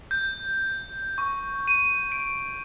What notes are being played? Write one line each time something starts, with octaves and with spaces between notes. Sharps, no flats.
G6
C#6
D#7
D7